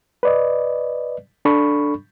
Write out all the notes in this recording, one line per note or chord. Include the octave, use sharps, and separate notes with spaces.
B4 D5 D#5
D4 A4 B5 C#6